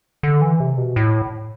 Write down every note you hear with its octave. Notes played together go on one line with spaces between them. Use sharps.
D3
E3
C3
B2
A2